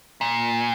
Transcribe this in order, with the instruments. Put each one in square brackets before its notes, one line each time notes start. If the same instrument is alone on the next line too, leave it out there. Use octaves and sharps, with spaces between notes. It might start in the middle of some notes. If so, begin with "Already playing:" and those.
[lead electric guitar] A#2